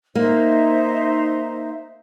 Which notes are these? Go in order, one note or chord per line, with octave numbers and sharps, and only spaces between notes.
A#3 D#4 C5 E5